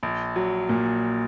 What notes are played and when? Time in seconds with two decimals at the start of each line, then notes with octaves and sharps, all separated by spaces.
0.03 A#1
0.36 F#3
0.69 A#2